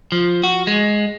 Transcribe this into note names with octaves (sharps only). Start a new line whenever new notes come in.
F3
F#4
G#3